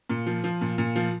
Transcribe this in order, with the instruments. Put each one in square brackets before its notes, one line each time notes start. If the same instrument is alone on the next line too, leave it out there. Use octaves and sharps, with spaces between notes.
[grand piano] A#2
F3
F3
A#2
A#2
F3